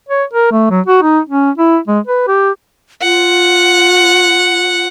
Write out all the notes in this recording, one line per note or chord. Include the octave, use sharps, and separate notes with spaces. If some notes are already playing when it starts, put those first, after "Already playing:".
C#5
A#4
A3
F#3
F#4
D#4
C#4
E4
G#3
B4
G4
F4 F#5